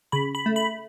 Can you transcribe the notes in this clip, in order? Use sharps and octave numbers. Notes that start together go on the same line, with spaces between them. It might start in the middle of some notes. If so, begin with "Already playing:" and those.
C#3 B5
B5
A3
B5